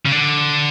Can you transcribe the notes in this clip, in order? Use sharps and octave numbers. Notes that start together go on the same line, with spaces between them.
C#3
D3